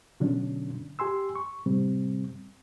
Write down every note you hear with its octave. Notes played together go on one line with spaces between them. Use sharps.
B2 D3 F#3 C#4 D4
G4 G#5 C6 E6
C#6
A2 C3 G3 C4